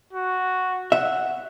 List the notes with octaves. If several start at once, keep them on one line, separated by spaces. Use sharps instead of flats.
F#4
E5 F#5